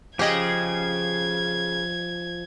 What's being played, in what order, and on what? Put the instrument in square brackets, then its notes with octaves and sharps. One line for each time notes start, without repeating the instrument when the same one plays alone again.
[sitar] C#3 G#4 [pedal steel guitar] F3 G#5 [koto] G4 D#5 [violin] G#6